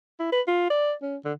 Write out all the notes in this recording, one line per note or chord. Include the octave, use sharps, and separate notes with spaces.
E4
B4
F4
D5
C#4
D3